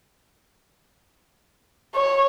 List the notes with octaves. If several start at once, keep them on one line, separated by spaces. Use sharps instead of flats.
C#5